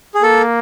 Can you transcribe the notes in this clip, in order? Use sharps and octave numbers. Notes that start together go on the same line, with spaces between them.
G#4
A#3 A4